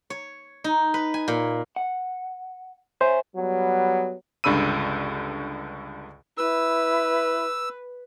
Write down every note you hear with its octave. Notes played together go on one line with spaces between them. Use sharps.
C#5
D#4
B4
G#5
A#2
F#5
C5 C#5 E5 G#5
F#3 G3 B3
C#2 G2 D3 B5 E6 D#7
E4 B4 E6